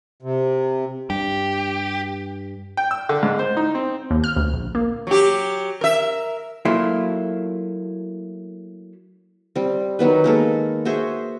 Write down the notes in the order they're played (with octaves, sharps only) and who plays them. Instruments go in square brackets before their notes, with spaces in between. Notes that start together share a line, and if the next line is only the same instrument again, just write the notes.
[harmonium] C3
[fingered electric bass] G2 [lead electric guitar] G4
[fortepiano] G5
E6
D3
G#2
C5
D#4
C4
[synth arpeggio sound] D#2
F6
D2
A#1
A#3
[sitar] F#3 G4
A#4 E5
[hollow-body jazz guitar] F#3 A3 A#3 E4 F4
[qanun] G3 C4
D#3 F#3 B3 B4
G#3 A#3 A4 B4
F#4 G#4 C5 E5